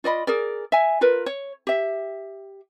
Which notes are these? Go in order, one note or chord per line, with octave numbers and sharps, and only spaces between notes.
F4 D5 D#5 B5
G#4 A#4 D5
E5 G#5
F4 A#4 B4
C#5
G4 E5